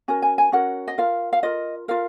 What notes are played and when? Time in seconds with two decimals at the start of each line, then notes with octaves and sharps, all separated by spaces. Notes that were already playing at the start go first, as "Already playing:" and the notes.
0.08 C#4 F#4 A#4 G#5
0.22 G#5
0.38 G#5
0.52 C#4 F#4 A#4 F#5
0.88 D#5
0.98 F4 A#4 F5
1.33 F5
1.43 F4 A#4 D#5
1.88 F4 A#4 F5